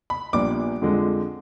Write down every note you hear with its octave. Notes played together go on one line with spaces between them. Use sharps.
B5
A#1 A#2 G3 B3 D4 D6
F2 D3 F3 G#3